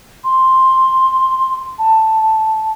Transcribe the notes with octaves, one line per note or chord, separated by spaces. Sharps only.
C6
A5